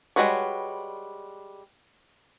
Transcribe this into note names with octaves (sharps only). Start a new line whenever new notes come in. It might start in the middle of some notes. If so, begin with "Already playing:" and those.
G3 G#3 F#4 B4 C#5